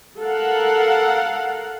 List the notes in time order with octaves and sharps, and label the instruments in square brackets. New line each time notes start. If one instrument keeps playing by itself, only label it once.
[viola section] A4 A#4 F5 F#5